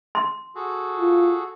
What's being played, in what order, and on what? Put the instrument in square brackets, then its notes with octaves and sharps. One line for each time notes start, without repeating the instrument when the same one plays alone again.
[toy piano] C6
[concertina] F#4 G#4 A4
[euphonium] F4